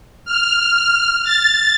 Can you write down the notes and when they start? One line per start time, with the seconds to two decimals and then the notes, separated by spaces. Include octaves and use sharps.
0.25 F6
1.23 A6